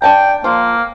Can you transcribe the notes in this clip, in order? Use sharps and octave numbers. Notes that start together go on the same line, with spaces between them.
D4 G5 A5 A#5
F3 A#3